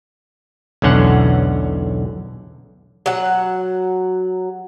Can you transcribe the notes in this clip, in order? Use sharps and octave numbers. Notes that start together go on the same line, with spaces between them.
B1 E2 D3 C#4 F#5
F#3 F#5